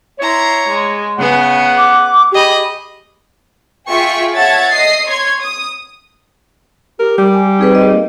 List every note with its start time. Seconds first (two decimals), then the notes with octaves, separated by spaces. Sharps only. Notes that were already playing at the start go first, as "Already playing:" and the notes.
0.20 E4 C#5 A#5 C6
0.68 G#3
1.18 C#3 B3 G#4 F#5
1.78 D6
2.31 G4 G#4 D#5 B5
3.90 F4 G#4 E5 G5 C#6 B6
4.35 C#5 E5 F#5 A5 G#6 A6
4.73 D#5 D#6 C7
5.07 C#5 C6 G#6
5.40 D#6
7.00 G4 A#4
7.18 G3 D6
7.33 G#5
7.59 C4 D#4 G#4 B4
7.75 D#5
7.93 A#3